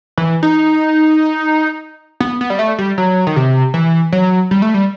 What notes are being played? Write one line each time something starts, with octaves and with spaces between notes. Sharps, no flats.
E3
D#4
B3
B3
G3
A3
G3
F#3
D#3
C3
E3
F#3
G3
A3
G3